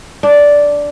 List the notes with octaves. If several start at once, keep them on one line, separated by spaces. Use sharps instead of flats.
D4